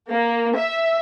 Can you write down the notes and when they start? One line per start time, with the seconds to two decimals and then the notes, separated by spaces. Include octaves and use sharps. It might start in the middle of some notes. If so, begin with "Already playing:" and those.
0.10 A#3
0.57 E5